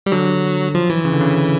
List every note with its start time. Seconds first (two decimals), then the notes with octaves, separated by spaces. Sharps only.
0.06 G3
0.12 D3 F#3
0.75 F3
0.90 E3
1.05 C#3
1.13 D3
1.20 C#3